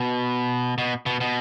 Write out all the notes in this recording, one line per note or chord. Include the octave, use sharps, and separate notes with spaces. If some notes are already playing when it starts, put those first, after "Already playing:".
Already playing: B2
B2
B2
B2